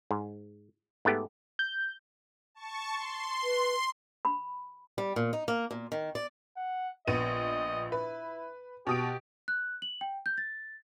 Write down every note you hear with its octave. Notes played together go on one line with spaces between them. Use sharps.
G#2
G#2 A3 B3 G4
G6
A5 C#6
C6
B4
B5
G3
A#2
D#4
A#3
A#2
D#3
D5
F#5
A#1 B3 D#5 D#7
E4 B4
B2 G4 D#6 D7
F#6
F#7
G5
G6
A6